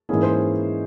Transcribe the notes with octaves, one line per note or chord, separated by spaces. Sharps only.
G#2 E3 A#3 C#4 E4 G#4
C5